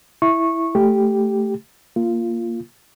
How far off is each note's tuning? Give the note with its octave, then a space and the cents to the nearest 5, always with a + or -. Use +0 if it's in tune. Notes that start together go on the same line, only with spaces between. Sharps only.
E4 +0 C#6 -15
A3 +0 G4 +0
A#3 +0 F4 -15